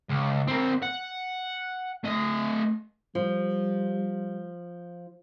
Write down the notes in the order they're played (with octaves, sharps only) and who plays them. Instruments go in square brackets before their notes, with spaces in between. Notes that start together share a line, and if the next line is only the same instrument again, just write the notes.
[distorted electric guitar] C#2
C4 A#4
F#5
A3 D#5
[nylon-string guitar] F3 [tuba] G3